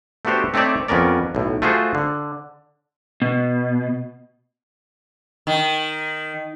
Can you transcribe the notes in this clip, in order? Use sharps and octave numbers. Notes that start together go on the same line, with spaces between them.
A3 B3 D4 F#4 G4 C5
A3 C4 D#4 C#5 D5 E5
F2 B3 C#4 A#4 D5
B1 A2
A3 F4 F#4 G#4 C5
D3
B2
D#3